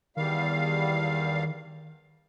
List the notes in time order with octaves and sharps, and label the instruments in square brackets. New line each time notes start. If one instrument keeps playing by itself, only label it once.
[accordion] E2 G3 F5 [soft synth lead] D#3